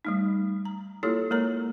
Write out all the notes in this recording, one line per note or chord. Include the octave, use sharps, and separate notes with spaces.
G3 A3 D#4
A#5
A#3 E4 F4 G4 A4 C#5
G#3 A#3 A#4 C#5 A#5